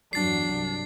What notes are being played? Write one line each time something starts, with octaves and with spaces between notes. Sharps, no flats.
E2 G2 F#3 D4 A6 C7
C2